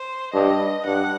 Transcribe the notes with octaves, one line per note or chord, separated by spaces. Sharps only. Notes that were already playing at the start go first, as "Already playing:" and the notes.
Already playing: C5
G2 D#5
G2 F#5